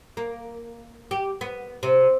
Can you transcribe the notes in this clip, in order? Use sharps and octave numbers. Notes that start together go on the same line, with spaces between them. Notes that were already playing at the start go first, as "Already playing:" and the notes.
A#3
G4
B3
C3